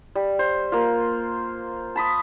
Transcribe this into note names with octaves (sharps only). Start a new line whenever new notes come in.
G3
C5
A#3 F4
A5 B5 D#6